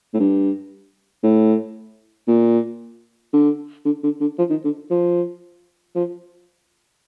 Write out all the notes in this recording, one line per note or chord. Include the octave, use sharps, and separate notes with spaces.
A2
G2
A2
A#2
D3
D3
D3
D3
F3
D#3
D3
F3
F3